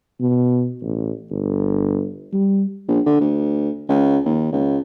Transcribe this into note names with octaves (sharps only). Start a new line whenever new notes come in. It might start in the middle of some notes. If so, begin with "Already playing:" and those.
B2
A1
G1
G3
A#1
D3
D2
C#2
D#2
C#2